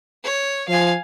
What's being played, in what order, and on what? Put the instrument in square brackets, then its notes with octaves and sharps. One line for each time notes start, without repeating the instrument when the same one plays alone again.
[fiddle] C#5
[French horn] F3 [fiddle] F5 G#5